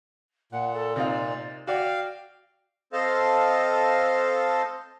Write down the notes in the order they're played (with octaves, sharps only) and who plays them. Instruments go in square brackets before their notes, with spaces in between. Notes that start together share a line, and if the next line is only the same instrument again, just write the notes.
[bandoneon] A#2 [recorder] F#5
[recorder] A4
[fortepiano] C3 D#4 F4 [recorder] D5
[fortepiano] F#4 D5 [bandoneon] F5 [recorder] G5
[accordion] C4 A4 C5 D#5 F5 A5